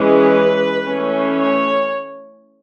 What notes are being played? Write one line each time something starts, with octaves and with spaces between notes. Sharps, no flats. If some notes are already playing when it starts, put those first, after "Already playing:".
Already playing: E3 G#3 C#4 B4
E3 A3 C#4
C#5